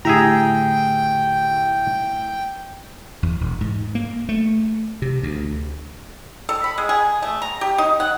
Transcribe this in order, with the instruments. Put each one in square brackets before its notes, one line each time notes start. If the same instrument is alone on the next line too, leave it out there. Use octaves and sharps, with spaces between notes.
[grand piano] A2 [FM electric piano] D3 E4 G4 [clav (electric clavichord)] G#4 E5 A#5 [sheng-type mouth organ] G5
[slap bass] E2
E1
G#2
A#3
A3
C3
D2
[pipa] A4
B5
G#3
G#4
A3
A#5
G4
D#4
F#5